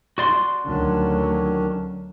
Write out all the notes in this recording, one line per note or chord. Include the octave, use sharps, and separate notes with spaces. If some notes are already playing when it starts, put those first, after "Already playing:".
F#4 D5 C6
D2 D#3 F#3 C#4 D4